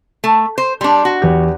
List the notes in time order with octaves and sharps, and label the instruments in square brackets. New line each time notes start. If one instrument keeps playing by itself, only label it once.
[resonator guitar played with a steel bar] A3
C5
[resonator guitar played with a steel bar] G3 D4 [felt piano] C6
[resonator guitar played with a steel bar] F#4
[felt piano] E2 G4